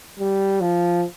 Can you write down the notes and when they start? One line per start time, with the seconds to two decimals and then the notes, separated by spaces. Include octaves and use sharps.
0.19 G3
0.61 F3